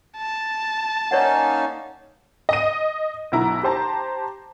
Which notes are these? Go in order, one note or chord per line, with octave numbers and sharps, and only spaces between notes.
A5
A#3 C#4 D#4 C#5 D5 F#5
D#5 D#7
B1 B2 E4 A#5
G4 C5 A5 A#5